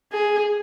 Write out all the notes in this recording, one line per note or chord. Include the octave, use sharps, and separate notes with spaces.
G#4